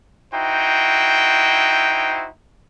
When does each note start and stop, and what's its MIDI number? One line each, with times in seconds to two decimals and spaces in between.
0.34 2.29 63
0.34 2.29 64
0.34 2.29 66
0.34 2.29 72
0.34 2.29 79